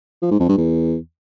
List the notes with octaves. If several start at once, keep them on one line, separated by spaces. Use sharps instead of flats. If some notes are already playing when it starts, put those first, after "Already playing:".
F3
G#2
F2
G2
E2